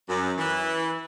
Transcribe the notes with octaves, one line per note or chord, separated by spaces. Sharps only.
F#2
E3